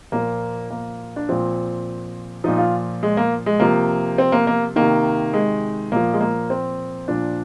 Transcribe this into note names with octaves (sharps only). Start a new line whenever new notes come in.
A#2 F3 A#3
A#3
D4
A#2 F3 C4
A#2 F3 D#4
F4
G#3
A#3
G#3
C3 F3 A#3
C4
A#3
A#3
C3 D#3 A#3
G#3
A#2 F3 A#3
G#3
A#3
C4
A#2 F3 D4